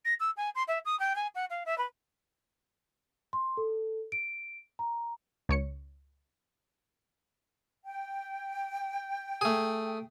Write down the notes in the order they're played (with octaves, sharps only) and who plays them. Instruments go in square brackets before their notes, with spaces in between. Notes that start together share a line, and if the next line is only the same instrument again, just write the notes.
[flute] A#6
E6
G#5
C6
E5
D#6
G5
G#5
F#5
F5
E5
B4
[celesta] C6
A4
D7
A#5
[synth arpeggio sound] C#2 C#5 C#7
[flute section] G5
[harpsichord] A3 G#4